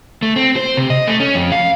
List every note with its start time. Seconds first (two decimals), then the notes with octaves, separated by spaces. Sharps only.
0.23 A3
0.36 C4
0.56 C5
0.77 C3
0.90 D#5
1.07 A3
1.20 C#4
1.35 F2
1.52 F5